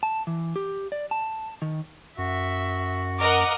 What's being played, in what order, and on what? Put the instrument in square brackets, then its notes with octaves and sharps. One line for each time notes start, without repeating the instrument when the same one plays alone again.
[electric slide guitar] A5
E3
G4
D5
A5
D#3
[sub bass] F#2 [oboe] F#4 [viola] E5
[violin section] A#4 D#5 F#5 [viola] D6